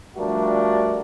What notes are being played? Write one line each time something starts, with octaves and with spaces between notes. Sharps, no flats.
F3 G3 A3 D4 F#4 A#4